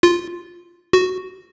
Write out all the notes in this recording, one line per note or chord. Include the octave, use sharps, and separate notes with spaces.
F4
F#4